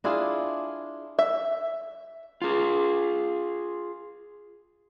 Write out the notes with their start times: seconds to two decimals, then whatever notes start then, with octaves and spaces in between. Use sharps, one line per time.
0.04 D4 E4 F4 G#4
1.19 E5
2.42 F4 G#4